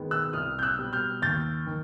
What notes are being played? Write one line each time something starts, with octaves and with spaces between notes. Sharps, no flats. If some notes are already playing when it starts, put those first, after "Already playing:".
Already playing: D#3 G#3 B3
E6 F#6
C2 D#6 F6
G6
E6 F#6
B2 G3
F6 G6
D#2 G6 A6
D#3